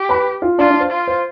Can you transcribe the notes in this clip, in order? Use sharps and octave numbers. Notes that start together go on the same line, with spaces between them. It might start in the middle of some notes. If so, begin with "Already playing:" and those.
Already playing: G4
B4 B5
F4 F5
D4 F4 D5
D4 D5
C5
F4
C5